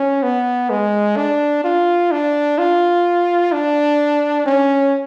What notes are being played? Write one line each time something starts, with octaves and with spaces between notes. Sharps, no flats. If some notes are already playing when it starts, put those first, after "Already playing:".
Already playing: C#4
B3
G#3
D4
F4
D4
F4
D4
C#4